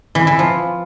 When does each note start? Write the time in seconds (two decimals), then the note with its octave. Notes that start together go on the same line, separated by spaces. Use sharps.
0.15 E3
0.27 E3
0.39 F3